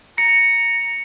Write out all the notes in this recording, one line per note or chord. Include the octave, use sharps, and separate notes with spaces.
A#5 C#7